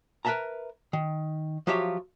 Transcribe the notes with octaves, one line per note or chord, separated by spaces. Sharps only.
A#4 B4 D#5 E5 A5 A#5
D#3
F3 F#3 F4 G4 C#5 E5